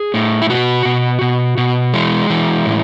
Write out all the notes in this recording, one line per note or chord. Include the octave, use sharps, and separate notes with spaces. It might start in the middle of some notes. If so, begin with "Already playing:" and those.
Already playing: G#4
A2
E4
B2 F#4
B2
B2
B2
E3 G#3
E3
A2